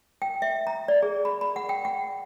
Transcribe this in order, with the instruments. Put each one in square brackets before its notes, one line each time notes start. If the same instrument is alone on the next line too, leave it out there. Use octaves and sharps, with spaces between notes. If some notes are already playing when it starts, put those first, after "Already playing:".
[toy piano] G5
E5
A#5
D5
G#4
B5
B5
F#5
G5
F#5